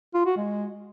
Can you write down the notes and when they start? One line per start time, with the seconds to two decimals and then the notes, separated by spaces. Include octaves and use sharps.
0.14 F4
0.26 F#4
0.37 G#3